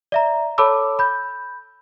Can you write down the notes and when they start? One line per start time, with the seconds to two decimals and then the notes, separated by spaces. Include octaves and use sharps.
0.12 D5 E5 A#5
0.58 A4 C#5 A5 B5 D6 E6
0.99 B5 G6